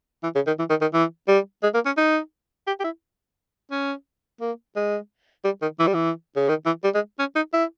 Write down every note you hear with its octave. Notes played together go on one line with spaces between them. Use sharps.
E3
C#3
D#3
E3
D#3
D#3
E3
G3
G#3
A#3
C#4
D#4
G4
G4
E4
C#4
A#3
G#3
G3
D#3
E3
G3
E3
C#3
D#3
E3
G3
G#3
C#4
D#4
E4